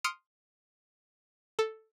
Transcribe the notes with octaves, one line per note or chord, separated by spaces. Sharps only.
C6 D#6 F6 C#7 D7
A4